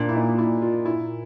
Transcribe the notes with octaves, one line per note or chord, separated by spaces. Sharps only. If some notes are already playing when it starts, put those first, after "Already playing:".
Already playing: A#2 D4
E4
D#4
E4
F4
E4